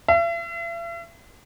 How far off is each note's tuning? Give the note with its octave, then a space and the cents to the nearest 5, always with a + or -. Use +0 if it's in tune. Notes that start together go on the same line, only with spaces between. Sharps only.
E5 +45